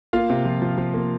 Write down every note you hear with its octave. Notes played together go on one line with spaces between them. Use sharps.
A#3 F4 F5
C3
F3
F3
F3
A#3